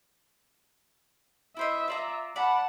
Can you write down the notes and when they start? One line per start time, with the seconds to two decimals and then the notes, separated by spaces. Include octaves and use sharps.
1.57 E4 C5 D#5 E5
1.88 F4 D5 A#5
2.36 D5 F#5 A5 B5